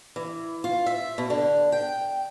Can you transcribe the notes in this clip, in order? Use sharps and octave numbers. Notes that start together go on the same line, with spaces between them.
E3
F4
E5
B2
D3
G5